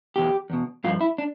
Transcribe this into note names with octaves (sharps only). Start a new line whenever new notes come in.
E2 B2 G4
E2 B2
G2 F3 F4
E4
D4